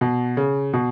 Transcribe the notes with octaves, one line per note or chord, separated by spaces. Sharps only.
B2
C#3
B2